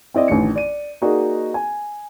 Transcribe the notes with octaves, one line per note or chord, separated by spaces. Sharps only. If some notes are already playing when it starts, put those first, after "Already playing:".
C4 E4 D5 D#5
A1 D3 D#3 C#7
D5 D#7
A#3 D#4 F#4 G#4 D5 D#5
G#5